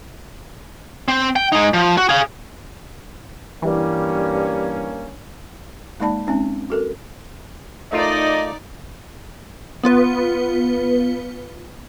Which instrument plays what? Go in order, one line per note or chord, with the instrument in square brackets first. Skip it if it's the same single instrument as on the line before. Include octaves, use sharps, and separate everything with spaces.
[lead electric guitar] C4
G5
G#3 D#4
F3
F#4
G#4 F5
[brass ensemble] G2 C#4 [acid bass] E3 [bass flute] G3 [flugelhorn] A#3
[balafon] G#3 A#3 D#4 D5 A5 B5
G#3 C4 C#4 D#4
F#4 A4 A#4
[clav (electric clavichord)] A3 F4 A#4 [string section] D#4 D5 [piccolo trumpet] D#5
[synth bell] B3 F4 B4